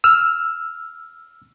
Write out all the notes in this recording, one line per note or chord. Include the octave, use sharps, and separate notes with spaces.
E6 F6